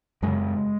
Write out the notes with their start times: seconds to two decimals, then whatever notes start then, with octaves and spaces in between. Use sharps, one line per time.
0.22 F#2 C#3 G#3